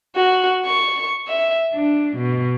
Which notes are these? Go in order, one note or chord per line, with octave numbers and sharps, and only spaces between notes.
F#4
C#6
E5
D4
B2